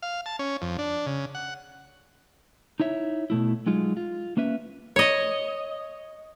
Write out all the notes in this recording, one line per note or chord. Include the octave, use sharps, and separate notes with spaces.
F5
A5
C#4
F2
D4
C#3
F#5
D#4 E4 C#5 E5
B2 A3 E4
F#3 G#3 D#4 F4
F4
A#3 C#4 B4 E5
C#5 D#5